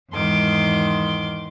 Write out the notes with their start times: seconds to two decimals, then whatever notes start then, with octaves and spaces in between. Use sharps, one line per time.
0.12 E2 G#2 D#3 C6 D6